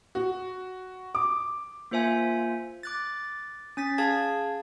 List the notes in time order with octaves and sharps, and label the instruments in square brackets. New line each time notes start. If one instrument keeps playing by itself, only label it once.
[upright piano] F#4
D6
[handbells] A#3 F4 C5 E5 G#5
D6 F#6 A6
C#4 A6 B6
G#4 F5 A5 G#6